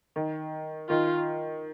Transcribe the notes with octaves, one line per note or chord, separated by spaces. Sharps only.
D#3
D#3 F4